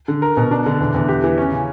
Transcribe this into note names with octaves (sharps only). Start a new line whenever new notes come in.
D3
A#4
B2
D4
D3
E2
E2
G4
E3
C#4
C#3